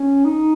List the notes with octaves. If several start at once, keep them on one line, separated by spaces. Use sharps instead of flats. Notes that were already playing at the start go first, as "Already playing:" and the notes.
Already playing: C#4
D#4